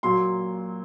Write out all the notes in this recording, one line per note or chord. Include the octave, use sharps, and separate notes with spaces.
A#2 F#3 A#3 C6